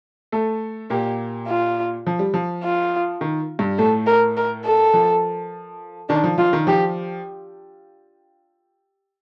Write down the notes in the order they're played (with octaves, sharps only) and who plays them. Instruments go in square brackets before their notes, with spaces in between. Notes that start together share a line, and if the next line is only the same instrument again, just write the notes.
[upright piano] A3 A4
[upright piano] A#2 A#3 [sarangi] G4
[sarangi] F4
[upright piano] F3
G3
F3
[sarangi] F4
[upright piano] D#3
G2 G3
[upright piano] A2 A3 [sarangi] A4
[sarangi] A#4
A#4
A4
[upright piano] F3
[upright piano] D#3 [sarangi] D4
[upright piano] F3
[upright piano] F3 [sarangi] F4
[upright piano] D#3
[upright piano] F3 [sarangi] G4